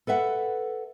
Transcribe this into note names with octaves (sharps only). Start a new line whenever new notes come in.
A4 B4 E5 F#5